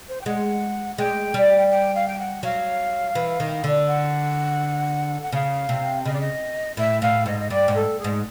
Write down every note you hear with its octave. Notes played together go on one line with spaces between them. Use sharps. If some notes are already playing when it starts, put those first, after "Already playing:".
C5
G5
G#3 F#5
G#3 G5
G3
G5
F5
G5
F#5
F#3 F5
E3
D#3
D3
F#5
F#5
C#3 F5
C3
C#3 D#5
D5
D#5
A2 E5
A2 F5
G#2 D#5
D#5
G2 D5
G#2
A4
G#4
G#2